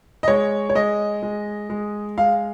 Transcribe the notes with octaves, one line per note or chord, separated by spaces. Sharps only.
D#5
G#3 C#5
C#5
G#3 D#5
G#3
G#3
G#3 F5